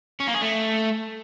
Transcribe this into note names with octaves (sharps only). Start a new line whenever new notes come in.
C#4
A#3
G#4
A3